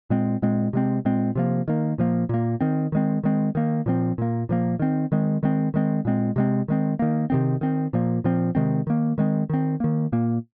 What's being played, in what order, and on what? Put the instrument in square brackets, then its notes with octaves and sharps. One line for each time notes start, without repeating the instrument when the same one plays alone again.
[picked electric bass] A#2 G#3 C4
A#2 G#3 C4
C3 G#3 C4
A#2 G#3 C4
C3 F3 A#3
D#3 A#3
A#2 F3 A#3
A#2 A#3
D#3 C4
D#3 G#3 C4
D#3 G#3 C4
D#3 A#3
A#2 F3 C4
A#2 A#3
A#2 F3 A#3
D#3 C4
D#3 G#3 C4
D#3 G#3 C4
D#3 G#3 C4
A#2 G#3 C4
C3 G#3 C4
D#3 G#3 C4
D#3 A#3
C3 D#3 C4
D#3 C4
A#2 F3 A#3
A#2 F3 C4
C3 D#3 G#3 C4
D#3 A#3
D#3 G#3 C4
D#3 C4
D#3 A#3
A#2 A#3